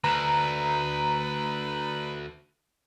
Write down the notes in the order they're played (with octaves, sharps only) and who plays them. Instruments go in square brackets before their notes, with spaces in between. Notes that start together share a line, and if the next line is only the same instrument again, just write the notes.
[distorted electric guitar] D2 [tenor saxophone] B4 [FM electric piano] A#5